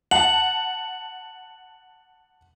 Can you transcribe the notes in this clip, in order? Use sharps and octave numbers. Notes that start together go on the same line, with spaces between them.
F#5 A5 F#7